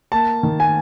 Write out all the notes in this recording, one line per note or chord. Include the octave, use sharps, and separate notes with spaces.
A#3 A5
D#3
G#5